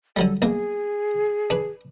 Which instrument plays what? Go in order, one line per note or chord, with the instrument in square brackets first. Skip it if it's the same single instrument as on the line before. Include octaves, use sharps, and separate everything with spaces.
[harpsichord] D3 F#3 G3 [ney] A4
[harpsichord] B1 A#3 [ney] G#4
[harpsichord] D4 B4